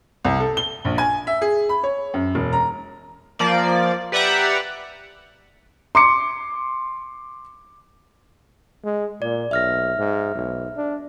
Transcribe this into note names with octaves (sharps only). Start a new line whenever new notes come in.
C2
A4
G7
A#1
G#5
E5
G#4
B5
C#5
F#2
E1
A#5
F3 A#3 D5
G4 B4 D5 E5 F#5 A#5
C6 D6 C#7
G#3
A#2 D5
B1 E5 F6 A#6
G#2
B1
D4